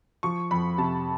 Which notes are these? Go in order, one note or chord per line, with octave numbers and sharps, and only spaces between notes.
F3 C#6
F2 B5
C3 A5